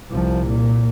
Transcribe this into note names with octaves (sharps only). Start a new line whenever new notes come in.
C2 F3
A#2